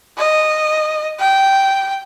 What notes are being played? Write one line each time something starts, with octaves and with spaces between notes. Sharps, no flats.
D#5
G5